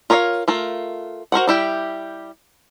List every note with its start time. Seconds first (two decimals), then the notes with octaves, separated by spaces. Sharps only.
0.10 F4 A#4 C#5 D#5 F5
0.48 A3 F4 A#4
1.32 F#4 A#4 C5 F#5
1.47 G3 E4 G4